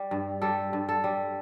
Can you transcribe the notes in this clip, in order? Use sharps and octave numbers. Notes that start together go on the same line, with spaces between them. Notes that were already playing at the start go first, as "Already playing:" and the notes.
Already playing: G3
G2
G3 A4
G2
A4
G3